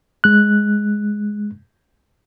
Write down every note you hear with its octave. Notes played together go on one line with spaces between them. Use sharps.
G#3 F#6